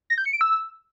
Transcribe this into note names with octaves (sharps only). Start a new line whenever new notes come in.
A#6
G6
C#7
D7
E6